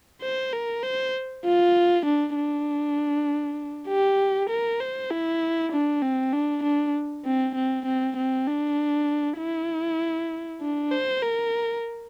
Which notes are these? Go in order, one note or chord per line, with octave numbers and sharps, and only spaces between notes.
C5
A#4
C5
F4
D4
D4
G4
A#4
C5
E4
D4
C4
D4
D4
C4
C4
C4
C4
D4
E4
D4
C5
A#4